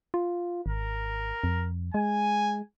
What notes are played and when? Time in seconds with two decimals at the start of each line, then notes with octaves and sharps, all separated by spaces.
0.14 F4
0.66 G#1 A#4
1.44 F2
1.94 G#3 G#5